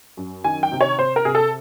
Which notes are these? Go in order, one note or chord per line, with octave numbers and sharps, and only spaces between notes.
F#2
D#3 G#5
G5
C3
C#5
C3 C5
A#4
C3 G#4
A4